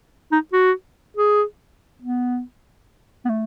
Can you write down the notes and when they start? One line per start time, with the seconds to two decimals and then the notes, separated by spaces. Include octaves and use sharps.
0.32 D#4
0.53 F#4
1.17 G#4
2.02 B3
3.25 B3
3.29 A3